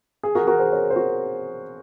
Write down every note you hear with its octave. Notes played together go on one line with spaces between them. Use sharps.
G#4
F#4 A#4
F#4 A#4
G#4 C5
A#4 C#5
C5
F#4 A#4